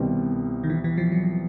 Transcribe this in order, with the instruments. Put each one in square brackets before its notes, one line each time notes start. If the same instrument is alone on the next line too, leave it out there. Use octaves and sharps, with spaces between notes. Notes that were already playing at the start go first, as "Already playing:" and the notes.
Already playing: [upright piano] C2 B2 G3 C4 [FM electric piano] D#3
[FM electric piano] D#3
E3
E3
F3
F#3